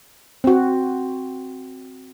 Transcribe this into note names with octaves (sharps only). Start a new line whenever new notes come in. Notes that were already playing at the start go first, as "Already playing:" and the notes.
C4 F#4